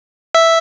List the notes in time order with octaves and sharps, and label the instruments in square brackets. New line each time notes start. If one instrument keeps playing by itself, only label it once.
[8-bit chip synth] E5